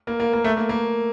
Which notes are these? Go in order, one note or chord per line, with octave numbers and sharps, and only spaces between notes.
A#3
A#3
A#3
A3
A#3
A#3